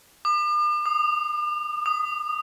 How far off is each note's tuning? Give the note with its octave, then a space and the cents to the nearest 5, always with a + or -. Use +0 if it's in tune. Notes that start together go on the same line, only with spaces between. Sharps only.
D6 +45
D#6 -25
D#6 -10